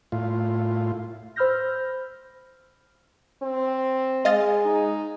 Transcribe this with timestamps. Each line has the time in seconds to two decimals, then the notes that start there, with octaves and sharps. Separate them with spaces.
0.12 A2 F4
1.36 C5 B5 E6 F6 G6 A#6
3.43 C4
4.25 G#3 D#5 F5 A6
4.65 D#4